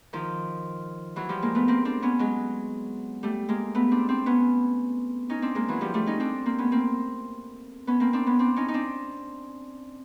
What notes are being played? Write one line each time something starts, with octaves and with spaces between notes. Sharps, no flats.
D#3 F3
E3 F#3
F3 G3
G#3 A#3
A3 B3
A#3 C4
C4 D4
B3 C#4
F#3 G#3
G3 A3
G#3 A#3
A3 B3
C4 D4
C4 D4
B3 C#4
C#4 D#4
C4 D4
G#3 A#3
E3 F#3
F3 G3
G3 A3
C#4 D#4
C4 D4
A#3 C4
B3 C#4
A#3 C4
B3 C#4
A#3 C4
C4 D4
B3 C#4
C4 D4
C#4 D#4
D#4
C4 D4